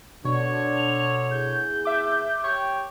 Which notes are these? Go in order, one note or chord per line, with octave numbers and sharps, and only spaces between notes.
B2 D3 D4 C#5
F7
B3 E4 G#4 G6
E5 D6
G4 C#5 G5